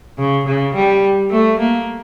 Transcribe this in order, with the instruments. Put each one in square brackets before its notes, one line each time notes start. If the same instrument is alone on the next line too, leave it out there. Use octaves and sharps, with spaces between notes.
[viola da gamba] C#3
C#3
G3
A3
A#3